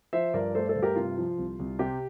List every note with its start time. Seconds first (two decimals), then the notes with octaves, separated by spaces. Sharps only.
0.13 F3 C5 E5
0.34 G2 A#4 D5
0.55 A3 A4 C5
0.62 D5
0.69 A4 C5
0.76 G2
0.82 G4 A#4
0.96 C3 F4
1.18 F3
1.38 C2
1.59 C2
1.79 C3 G4